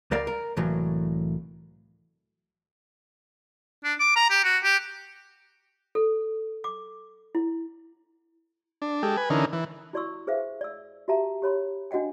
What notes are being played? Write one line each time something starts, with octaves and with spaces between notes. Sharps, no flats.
C#2 G3 A#4 D5 F5
A#4
C2 A2 E3 F#3 A#3
D4
D6
A#5
G4
F#4
G4
A4
D6
E4
D4
G#3 G4 A4
B4 G#5
D3 E3 C#4 D#4 A#4
E3
E4 F#4 D5 C6 C#6 E6
G#4 B4 C5 E5 F5
D5 E6
F#4 G4 E5 F5 A5 A#5
G4 C#5 B5 C6
D4 F#4 D#5 F#5 G5